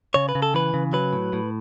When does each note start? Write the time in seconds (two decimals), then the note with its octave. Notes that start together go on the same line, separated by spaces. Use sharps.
0.14 C#3 C#5
0.29 B4
0.35 C#3
0.42 A4
0.54 E3 B4
0.74 C#3
0.93 F#3 B4
1.13 A2
1.33 A2